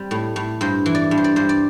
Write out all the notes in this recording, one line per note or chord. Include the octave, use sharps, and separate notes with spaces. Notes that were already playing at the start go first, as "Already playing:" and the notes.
Already playing: G3 C4
A2
A2
G2 C5
E3
D5
G2
C5
D5
G2 C5
D5